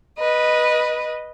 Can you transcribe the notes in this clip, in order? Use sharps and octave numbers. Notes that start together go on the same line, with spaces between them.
B4 D#5